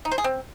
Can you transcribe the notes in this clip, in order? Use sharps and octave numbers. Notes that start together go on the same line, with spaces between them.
D#4
C5
G#4
C4